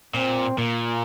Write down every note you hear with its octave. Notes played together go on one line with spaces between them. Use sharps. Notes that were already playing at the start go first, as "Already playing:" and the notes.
A#2 C4
A#2 A#3